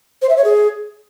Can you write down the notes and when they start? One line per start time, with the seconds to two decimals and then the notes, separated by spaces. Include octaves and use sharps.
0.21 C5
0.29 E5
0.36 C#5
0.44 G#4